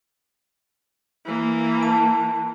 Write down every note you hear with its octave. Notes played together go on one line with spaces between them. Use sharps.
E3 A#3
A5